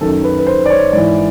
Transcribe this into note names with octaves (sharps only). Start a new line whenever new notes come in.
F#2 D#3 A4
B4
B4
C5
D5
C#5
G#2 E3 D5